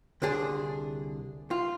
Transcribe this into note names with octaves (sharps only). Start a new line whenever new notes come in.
C2 D3 D4 G#4
F4